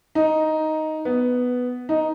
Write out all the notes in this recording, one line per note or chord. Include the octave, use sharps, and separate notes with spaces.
D#4
B3
D#4